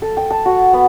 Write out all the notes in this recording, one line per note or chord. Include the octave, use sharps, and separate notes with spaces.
A4
G5
A5
F#4
B3